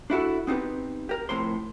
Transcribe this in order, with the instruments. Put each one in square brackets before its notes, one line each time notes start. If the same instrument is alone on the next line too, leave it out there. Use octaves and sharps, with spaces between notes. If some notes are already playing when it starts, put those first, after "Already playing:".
[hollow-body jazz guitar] D4 E4 F#4 A4
B3 C4 D#4 G4 B4
G4 A#4
F2 A2 C3 A#4 C5 C6